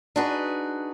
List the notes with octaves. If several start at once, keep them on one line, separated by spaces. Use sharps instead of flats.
D4 D#4 F#4 G#4 B4